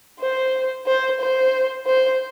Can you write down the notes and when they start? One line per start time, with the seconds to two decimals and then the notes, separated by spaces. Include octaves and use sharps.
0.19 C5
0.86 C5
1.20 C5
1.86 C5